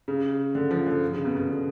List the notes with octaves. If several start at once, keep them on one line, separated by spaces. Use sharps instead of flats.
C#3
D3
F3
D3
C#3
B2
B2
D3